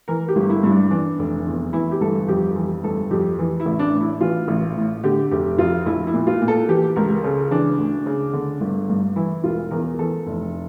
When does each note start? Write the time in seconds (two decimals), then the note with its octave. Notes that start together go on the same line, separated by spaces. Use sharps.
0.08 E3 A#4
0.28 G4
0.36 G1
0.50 E4
0.63 G2 E4
0.70 D4
0.91 E3 D4
1.19 F1
1.46 E2
1.73 E3 E4
1.92 G4
2.01 G1 A4
2.28 F2 G4
2.56 E3
2.84 G1 A4
3.11 F2 G4
3.39 E3
3.60 E4
3.66 A1
3.79 D4
3.93 A2
4.01 E4
4.21 E3 F4
4.48 A1
4.77 A2
5.04 D3 G4
5.31 F1 G4
5.58 F2 F4
5.86 A#1 E4
6.07 E4
6.14 A#2
6.27 F4
6.41 A#2
6.48 A4
6.69 E3 G4
6.96 C#2 A#4
7.23 C#3 A4
7.51 E3 D4
7.79 D2
8.06 C#3
8.33 D3
8.61 G1
8.89 G2
9.16 E3 E4
9.44 E1 F4
9.71 E2 A#4
9.99 E3 A4
10.27 F1